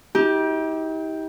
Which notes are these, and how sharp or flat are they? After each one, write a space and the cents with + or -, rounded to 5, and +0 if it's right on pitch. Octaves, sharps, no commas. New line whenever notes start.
D#4 +45 G4 +0